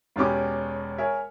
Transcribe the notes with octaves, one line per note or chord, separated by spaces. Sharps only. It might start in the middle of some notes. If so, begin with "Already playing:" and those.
E1 B2 C#4 G4 D6
G#4 A#4 C#5 E5